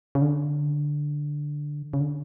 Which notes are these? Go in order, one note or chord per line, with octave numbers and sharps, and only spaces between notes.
C#3
D3
C#3
D3